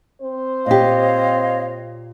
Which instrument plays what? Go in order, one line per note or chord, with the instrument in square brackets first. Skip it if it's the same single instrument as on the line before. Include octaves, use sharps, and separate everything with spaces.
[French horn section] C4 C5
[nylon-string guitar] A#2 G4 [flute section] C#5 D#5 F5